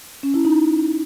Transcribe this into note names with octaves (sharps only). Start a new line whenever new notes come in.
C#4
E4
D#4